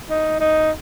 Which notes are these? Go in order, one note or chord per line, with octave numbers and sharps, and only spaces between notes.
D#4
D#4